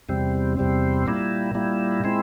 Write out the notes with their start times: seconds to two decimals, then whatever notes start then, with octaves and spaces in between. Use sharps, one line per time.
0.09 E2 C3 G3 C4
0.57 E2 C3 G3 C4
1.07 A#2 G3 A#3 E4
1.54 A#2 G3 A#3 E4
2.04 A#2 G#3 C4 E4